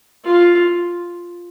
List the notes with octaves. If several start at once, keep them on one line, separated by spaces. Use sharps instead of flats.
F4